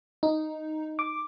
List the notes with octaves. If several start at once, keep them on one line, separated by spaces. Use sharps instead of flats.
D#4
D6